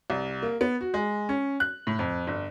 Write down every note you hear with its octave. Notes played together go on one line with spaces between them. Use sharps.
C2
A#3
B3
F#4
G#3
C#4
F#6
A2
F2
G1